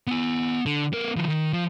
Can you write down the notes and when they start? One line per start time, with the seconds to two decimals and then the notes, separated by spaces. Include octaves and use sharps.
0.07 B3 G#5
0.66 D3
0.93 B3 A#4
1.17 D#3 F3
1.28 D#3
1.53 F3